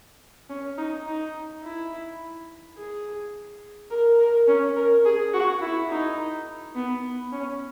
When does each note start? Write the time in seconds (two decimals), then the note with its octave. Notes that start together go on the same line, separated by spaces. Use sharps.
0.49 C#4
0.78 D#4
1.06 D#4
1.63 E4
2.77 G#4
3.90 A#4
4.19 A#4
4.47 C#4
4.76 A#4
5.05 G#4
5.33 F#4
5.61 E4
5.90 D#4
6.75 B3
7.32 C#4